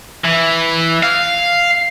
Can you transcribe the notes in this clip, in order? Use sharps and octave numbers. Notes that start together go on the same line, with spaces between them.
E3
F5